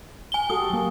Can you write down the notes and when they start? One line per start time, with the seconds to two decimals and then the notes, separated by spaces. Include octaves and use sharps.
0.32 G#5 G7
0.50 F#4 G4 A4 D#6
0.70 F#3 A#3